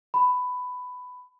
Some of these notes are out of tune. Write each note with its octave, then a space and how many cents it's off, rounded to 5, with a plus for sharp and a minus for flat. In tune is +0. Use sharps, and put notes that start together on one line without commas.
B5 +15